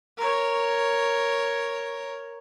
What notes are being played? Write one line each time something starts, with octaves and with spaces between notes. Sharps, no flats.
A#4 C#5